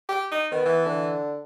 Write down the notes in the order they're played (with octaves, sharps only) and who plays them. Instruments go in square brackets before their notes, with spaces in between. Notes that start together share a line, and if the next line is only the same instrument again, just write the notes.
[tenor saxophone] G4
D#4
[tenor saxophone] D#3 [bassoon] B3
[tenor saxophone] E3
[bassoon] D3